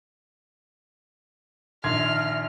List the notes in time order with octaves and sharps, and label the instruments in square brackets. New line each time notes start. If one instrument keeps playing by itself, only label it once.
[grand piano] A#1 D#3 G#6 [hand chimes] E5 C6 C7 [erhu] F6